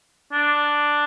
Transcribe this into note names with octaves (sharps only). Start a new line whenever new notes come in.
D4